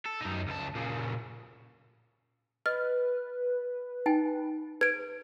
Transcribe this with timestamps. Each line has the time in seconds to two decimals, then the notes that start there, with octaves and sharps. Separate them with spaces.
0.06 A4
0.21 F#2 D#4
0.48 C#2 A5
0.75 A#2 C#3
2.66 B4 D#5 F6
4.06 D#4 G5 G#5
4.81 B4 G#6 D7